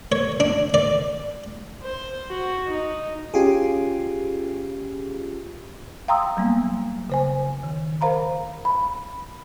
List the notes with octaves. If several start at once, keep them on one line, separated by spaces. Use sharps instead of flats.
C#5
D4
D5
C5
F#4
D#4
C#4 F4 G4 G#4
F5 G5 A#5 C6 D#6 E6
F#3 G3 A#3 B3
C#3 C5 G#5
D#3
A#4 C5 F5 A#5 B5
B5